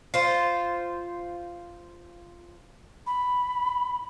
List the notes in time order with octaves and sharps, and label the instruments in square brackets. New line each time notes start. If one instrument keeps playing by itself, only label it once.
[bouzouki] F4 C5
[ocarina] B5